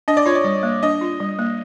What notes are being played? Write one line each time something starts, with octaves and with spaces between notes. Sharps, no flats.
D4 D#5
D5
F4 C#5
D5
G3
A#3
D4 D#5
F4
G3
A#3